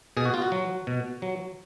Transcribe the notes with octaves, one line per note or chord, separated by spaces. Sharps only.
B2 G#4
F#4
F4
F#4
F#3
B2
F#3